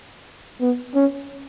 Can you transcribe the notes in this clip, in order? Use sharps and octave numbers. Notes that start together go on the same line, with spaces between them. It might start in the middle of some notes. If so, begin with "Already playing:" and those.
B3
C#4